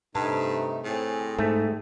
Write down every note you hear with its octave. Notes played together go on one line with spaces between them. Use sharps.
G2 C3 A3 D#4 A5
A2 C4 G#4
G#2 A3